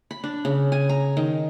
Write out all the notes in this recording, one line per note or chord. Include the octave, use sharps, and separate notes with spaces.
B5
D4
C#3
G#5
A#5
D#3